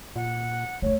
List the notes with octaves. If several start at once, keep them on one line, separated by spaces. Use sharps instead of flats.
A#2 F#5
F1 D2 A3 C#5